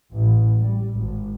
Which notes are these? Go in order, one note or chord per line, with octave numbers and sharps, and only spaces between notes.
A1
G3
G#1